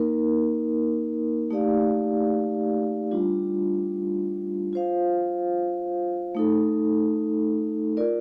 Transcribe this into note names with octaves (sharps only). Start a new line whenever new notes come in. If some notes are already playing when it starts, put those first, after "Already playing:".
Already playing: A#3 D#4 A#4
A3 D#4 G4 D5 F5
G3 D4 F4
F4 C5 F5
A3 D#4 A4
F4 A#4 D5